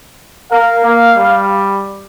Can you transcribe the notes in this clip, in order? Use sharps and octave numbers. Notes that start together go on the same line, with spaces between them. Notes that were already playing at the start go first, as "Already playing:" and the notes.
A#4 F5
A#3
G3